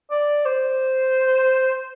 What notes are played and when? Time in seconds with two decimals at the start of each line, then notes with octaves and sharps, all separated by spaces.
0.11 D5
0.45 C5